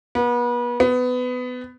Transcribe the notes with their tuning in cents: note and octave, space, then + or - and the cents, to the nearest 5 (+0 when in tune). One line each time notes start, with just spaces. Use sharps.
B3 -35
B3 +20